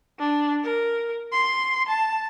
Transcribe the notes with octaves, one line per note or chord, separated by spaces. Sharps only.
D4
A#4
C6
A5